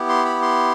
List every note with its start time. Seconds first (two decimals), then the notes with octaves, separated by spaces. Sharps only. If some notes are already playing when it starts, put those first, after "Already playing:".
Already playing: B3 E4 G4
0.09 C6
0.25 B5
0.42 C6